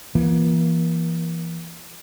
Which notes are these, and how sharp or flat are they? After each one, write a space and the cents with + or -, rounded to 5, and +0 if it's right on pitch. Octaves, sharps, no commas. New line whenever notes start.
E3 +30 A#3 +35